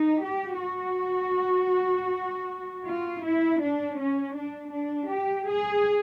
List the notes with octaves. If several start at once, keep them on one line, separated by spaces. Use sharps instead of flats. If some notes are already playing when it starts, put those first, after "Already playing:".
Already playing: D#4
G4
F#4
F4
E4
D4
C#4
D4
D4
G4
G#4